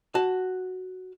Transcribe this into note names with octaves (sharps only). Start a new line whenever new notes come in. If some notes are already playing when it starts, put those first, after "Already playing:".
F#4 A5